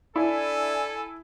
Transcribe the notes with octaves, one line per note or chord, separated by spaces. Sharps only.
D4 E4 A4 G#5